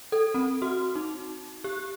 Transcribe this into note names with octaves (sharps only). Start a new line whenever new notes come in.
A4
C4
F#4
D#4
G4